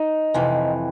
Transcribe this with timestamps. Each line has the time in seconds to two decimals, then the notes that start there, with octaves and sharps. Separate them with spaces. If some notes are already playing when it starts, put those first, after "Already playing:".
Already playing: D#4
0.34 F2 C3 E3